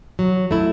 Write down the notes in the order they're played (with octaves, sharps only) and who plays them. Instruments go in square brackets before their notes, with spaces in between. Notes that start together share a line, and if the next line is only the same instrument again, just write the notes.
[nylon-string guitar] F#3
A3 E4